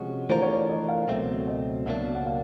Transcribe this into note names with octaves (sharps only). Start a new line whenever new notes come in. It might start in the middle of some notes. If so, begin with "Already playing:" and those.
Already playing: C3 F3 G#3 C#4 F#4
E3 A3 D4 F4 A#4 C5
C#5
D5
D#5
F5
C#2 B2 F#3 A3 C4 E5
D#5
C#2 B2 F#3 A#3 D4 E5
F#5
F5